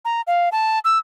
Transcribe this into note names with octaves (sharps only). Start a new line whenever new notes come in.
A#5
F5
A5
E6